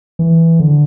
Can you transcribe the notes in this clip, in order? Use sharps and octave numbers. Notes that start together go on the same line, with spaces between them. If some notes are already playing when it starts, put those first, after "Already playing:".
E3
D3